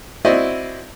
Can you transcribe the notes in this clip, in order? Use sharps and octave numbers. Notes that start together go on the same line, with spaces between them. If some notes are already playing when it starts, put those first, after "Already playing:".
C4 E4 F#4 D5 D#5